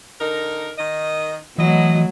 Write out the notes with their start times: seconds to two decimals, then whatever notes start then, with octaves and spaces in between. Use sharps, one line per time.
0.21 D3 D#4 A#4
0.78 D#3 D#5
1.58 B2 E3 F#3 A3 E4 D#5